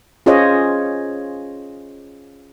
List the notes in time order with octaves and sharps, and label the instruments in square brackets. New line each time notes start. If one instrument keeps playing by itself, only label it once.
[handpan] C#4 F4 G#4 C5 C#5 D#5